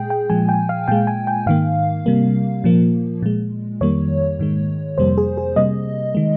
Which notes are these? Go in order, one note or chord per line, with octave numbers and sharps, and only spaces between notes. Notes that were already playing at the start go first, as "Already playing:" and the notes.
Already playing: A#2 G#3 G#4 G5
G5
A#2 F3 G#3 G#5
G5
F5
A#2 G#3 G5
G#5
G5
G#2 D#3 A#3 F5
C3 G3 A#3
A#2 F3 A#3
A#2 G#3
F2 D#3 G3 A#3 C#5
G#2 D#3 G#3
F2 C3 G3 A#3 C5
G#4
G#4
C3 G3 A#3 D#5
D#3 G#3